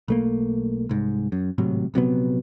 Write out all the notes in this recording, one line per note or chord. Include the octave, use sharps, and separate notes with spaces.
B1 A3 A#3
C2 G#2
F#2
G#1 A2 C3 F#3
A#1 C3 F#3 B3